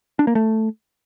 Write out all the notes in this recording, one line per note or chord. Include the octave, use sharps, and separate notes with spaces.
D4
A#3
A3